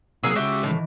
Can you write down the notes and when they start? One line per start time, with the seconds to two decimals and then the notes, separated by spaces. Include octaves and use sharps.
0.24 C3 F#3 A#3 G#4 F#5 E6
0.35 C#3 G#3 F#4 G4 E5
0.63 A2 D#3 E3